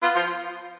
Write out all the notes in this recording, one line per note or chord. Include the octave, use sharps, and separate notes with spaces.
B3 F4
F3 F4